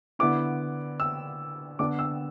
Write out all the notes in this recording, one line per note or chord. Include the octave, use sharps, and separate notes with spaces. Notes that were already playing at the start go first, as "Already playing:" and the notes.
D3 B3 E4 D6
E6
D3 B3 D4 D6
E6